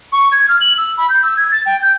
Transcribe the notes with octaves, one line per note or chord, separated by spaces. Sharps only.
C#6
G#6
F6
F#7
E6
B5
G6
E6
G#6
A6
G5
G6